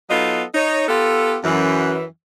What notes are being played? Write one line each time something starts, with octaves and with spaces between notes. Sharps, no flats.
F#3 B3 D#4 F4 A4 D#5
D#4 C#5
B3 F4 G4 A4
F#2 E3